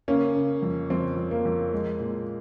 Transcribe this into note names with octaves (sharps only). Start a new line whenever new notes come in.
C#3 A#3 C#4
C#3
F2
F2 C4
F2
A#3
F2
G#3
A#2